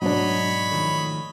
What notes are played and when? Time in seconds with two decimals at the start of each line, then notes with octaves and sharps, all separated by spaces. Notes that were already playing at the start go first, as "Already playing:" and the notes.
0.02 G#2 B2 F#3 D4 C#5 D#5 B5
0.72 D#3 F3 A3